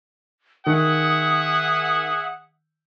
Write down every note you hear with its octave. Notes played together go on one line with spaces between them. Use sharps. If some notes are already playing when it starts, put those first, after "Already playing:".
D#3 G#4 E5 F#5 D#6